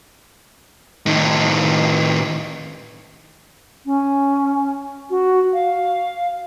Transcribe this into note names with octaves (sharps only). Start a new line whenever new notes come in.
A2 D#3
C#4
F#4
F5